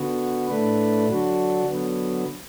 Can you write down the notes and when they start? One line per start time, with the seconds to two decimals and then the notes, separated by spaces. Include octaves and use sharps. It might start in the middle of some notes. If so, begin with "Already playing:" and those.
Already playing: D3 B3 F#4
0.48 A2 A3 D4 B4
1.07 D3 F#3 D4 F#4
1.65 D3 F#3 B3